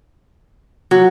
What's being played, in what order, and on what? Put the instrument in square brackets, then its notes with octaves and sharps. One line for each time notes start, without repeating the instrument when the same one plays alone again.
[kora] F#3